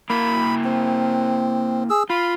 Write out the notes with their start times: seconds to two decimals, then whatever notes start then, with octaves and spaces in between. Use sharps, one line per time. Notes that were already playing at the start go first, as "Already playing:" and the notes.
0.10 A#3 E4 A#4 B5
0.64 C4
1.90 G#4 E6
2.10 F4 B5